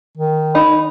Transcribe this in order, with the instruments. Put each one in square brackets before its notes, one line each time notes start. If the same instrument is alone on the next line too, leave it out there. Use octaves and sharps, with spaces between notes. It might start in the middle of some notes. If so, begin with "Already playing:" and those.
[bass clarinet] D#3
[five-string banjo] D#4 [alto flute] B5